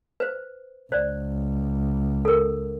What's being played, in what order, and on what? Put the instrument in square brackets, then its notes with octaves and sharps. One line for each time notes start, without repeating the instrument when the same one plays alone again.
[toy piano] B4 C5
[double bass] C#2 [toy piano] C5 D5
[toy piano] A4 A#4